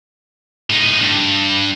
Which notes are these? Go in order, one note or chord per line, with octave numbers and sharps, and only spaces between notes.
A2 D#4
G2